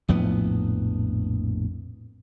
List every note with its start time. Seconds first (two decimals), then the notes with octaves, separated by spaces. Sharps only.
0.08 A#1 F2 A2 B3